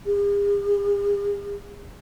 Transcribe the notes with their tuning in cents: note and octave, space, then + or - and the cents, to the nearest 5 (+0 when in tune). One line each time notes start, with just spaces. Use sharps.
G#4 -45